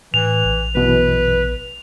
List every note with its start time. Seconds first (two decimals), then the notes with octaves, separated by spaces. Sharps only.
0.14 A2 E3 F7
0.45 A#1
0.75 F#2 B2 E3 B4